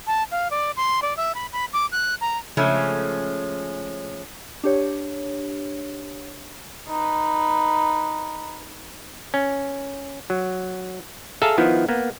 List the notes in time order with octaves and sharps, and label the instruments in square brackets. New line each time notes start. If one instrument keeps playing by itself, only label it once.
[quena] A5
F5
D5
C6
D5
E5
B5
B5
D6
F#6
A#5
[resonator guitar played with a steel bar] C#3 F3 G#3 A3 C#4
[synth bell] D4 G4 C#5
[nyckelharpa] D#4 B4
[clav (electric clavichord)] C#4
F#3
G#4 A4 E5 F5 A5 A#5
D#3 F3 B3 E4
A#3 B3